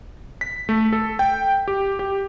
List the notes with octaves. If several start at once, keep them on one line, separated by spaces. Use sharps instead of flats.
B6
A3
A4
G5
G4
G4